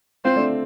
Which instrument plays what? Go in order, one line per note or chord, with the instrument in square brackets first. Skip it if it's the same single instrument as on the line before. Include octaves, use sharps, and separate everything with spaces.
[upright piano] C4 F4 [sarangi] C5
[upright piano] A3 D4